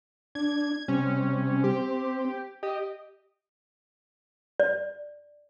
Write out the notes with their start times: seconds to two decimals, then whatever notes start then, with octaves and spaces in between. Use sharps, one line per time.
0.35 D4 G#6
0.88 C3 G3 C#4
1.64 C4 G4
2.63 G4 D#5
4.60 D5